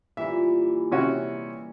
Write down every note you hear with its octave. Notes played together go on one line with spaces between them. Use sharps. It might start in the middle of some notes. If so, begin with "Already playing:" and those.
A#2 E3 G3 E5
C3 C#4 F#4